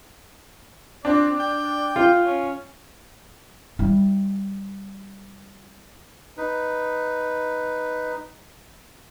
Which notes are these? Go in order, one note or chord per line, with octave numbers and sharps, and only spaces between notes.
C4 D4 D5
G5
F4
C#4
G3 E4
D#4 B4